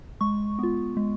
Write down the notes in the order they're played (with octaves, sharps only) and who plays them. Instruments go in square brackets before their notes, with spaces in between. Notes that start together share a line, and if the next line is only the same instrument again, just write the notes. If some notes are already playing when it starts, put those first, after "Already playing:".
[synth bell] G#3 C#6
B3 F4
G#3